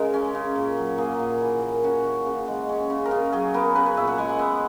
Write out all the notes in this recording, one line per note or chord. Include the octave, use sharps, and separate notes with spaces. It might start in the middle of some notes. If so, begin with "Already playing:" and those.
Already playing: C#3 G#3 A#4
C#4
C#3
A#2
F#3
A#3 G#4
A#2
E3
A#3
C#4 F#4
E3
C#3
G#3
C#4
C#3
A#4
C#3 G#4
F#3 G#4
B3 A#4
C#3 B4
C#5
A#2 E5
F#5
G#3 G#5
F#5
B3 E5